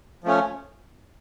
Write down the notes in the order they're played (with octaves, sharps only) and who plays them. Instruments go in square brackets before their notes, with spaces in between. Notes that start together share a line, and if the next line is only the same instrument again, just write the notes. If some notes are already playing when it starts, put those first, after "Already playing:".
[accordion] F3 A3 C#4